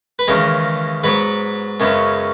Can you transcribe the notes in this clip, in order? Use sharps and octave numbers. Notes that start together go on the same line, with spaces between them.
B4
D#2 C#3 E3 G#3 A#4
G#2 F#3 B3 B4
F#2 C#3 G#3 B3